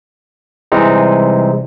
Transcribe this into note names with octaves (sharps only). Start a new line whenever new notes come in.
C3 E3 G3 G#3 C4 D#4